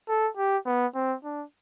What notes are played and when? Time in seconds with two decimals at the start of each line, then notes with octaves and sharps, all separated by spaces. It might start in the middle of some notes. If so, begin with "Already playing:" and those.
0.09 A4
0.37 G4
0.66 B3
0.95 C4
1.24 D4